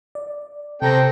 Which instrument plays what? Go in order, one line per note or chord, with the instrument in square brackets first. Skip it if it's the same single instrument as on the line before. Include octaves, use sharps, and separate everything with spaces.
[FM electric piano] D5
[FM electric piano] C3 A#5 A#6 [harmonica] C4 A4 G5